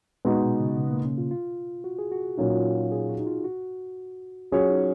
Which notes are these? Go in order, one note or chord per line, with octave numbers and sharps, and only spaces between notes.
A#2 G#3 B3 D#4 F#4
B2
C#3
C#3
A#3
C#4
F4
F4
F#4
G#4
F#4
A#2 F#3 A#3 C#4 D#4
F4
F#4
G#4
F#4
D#4
F4
F#4
F#3 C#4 F4 G#4 C#5
D#4